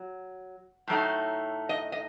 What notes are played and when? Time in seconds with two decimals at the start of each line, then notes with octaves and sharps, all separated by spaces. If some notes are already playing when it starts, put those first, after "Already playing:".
Already playing: F#3
0.88 A2 F#3 A3 D#4
1.69 D#5
1.92 D#5